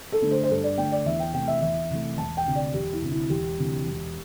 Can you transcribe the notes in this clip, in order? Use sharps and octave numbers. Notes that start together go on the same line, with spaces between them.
A4
D3 A3 D4
C5
C5
G2 A4
D5
D3 A3 D4 G5
D5
E2 E5
G5
C3 E3 A3 G5
E5
E2 E5
C3 E3 A3
E1 A5
G5
D2 C3
D5
E1 G4
E4
D2 C3
E4
E1 G4
D2 C3 E3
E1